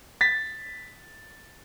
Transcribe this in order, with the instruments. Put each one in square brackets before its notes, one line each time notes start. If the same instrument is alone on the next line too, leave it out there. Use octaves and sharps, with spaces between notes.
[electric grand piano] A6 B6